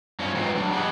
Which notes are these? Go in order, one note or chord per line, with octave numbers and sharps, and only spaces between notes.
G2 F3 C#4
F#3 G#3 C4 F4 B4
F#3 D4
G4 G#4 B4 D5 D#5 F#5